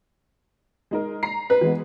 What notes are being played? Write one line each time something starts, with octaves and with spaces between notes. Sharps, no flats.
G#3 D#4 A#4
A#5 C7
B4
E3 G#3 B3